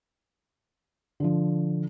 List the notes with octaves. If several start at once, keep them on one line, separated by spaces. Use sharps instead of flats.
D3 F3